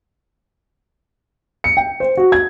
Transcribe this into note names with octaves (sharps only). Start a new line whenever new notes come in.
C#7
G5
C5
F#4
G#6